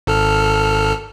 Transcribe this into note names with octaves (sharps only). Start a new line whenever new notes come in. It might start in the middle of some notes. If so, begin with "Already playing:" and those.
G#1 A4 F6